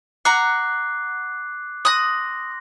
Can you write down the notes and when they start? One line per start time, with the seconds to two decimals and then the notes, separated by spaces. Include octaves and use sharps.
0.25 F#5 A#5 D6 F#6 C7
1.85 C6 D#6 F#6 A#6